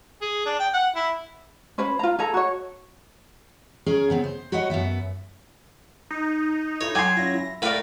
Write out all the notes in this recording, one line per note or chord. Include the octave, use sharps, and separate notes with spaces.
G#4
D4
G5
F#5
E4
C#4 B4 C5 B5
F4 A#5
G#4 A4 A#5
F#4 C#5
C#4 G#4 A#4
C#3 B3 C4
C5
F#4 B4 C#5 D#5 F#5
F#2 F3 B3 E5
D#4
E4 F4 A4 C#5
F#3 G5 G#5 C6 D6
C#4 E4 F4 A#6
E4
A2 A#4 B4 D5 F5